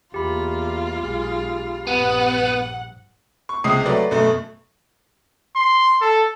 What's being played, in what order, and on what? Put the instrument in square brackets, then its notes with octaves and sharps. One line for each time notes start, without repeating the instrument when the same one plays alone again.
[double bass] E2 A#3 [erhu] F4 [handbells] G4 B5
[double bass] B1 G#3
[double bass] A#1 G2 [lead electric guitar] B3 [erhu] F#5
[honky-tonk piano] C#6
C#2 C3 G#3 D#6 C7
F#3 A3 B4 D5
F#2 B2 A3
[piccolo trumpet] C6
A4